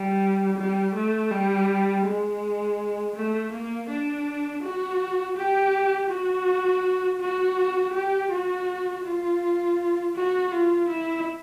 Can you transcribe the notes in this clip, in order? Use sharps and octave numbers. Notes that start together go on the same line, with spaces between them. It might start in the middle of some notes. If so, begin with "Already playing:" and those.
Already playing: G3
G3
A3
G3
G#3
A3
A#3
D4
F#4
G4
F#4
F#4
G4
F#4
F4
F#4
F4
E4